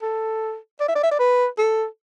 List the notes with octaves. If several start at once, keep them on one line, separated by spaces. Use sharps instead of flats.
A4
D5
E5
D5
E5
D5
B4
A4